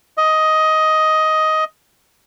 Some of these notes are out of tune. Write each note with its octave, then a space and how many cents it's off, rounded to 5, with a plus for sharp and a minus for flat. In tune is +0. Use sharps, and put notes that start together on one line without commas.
D#5 +10